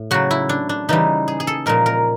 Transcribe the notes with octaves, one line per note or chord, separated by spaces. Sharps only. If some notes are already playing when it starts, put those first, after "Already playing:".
Already playing: A2
C#3 F#3 F#4
E4
D4
D4
C#3 E3 G3 D#4
G#4
G#4
A4
A#2 F3 G#3 A#4
A#4